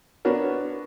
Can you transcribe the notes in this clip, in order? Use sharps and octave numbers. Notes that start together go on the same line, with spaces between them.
B3 D4 F#4 A#4 C#5